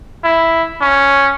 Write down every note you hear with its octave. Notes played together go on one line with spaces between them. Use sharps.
E4
C#4